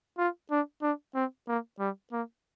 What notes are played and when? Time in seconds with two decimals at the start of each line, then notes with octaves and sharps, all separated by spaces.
0.18 F4
0.51 D4
0.82 D4
1.15 C4
1.48 A#3
1.79 G3
2.12 A#3